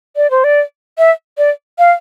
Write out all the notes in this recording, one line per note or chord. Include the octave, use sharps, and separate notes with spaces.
D5
C5
D5
E5
D5
F5